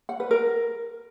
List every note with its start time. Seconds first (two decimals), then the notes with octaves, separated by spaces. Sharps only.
0.09 F#5
0.20 B4
0.31 A#4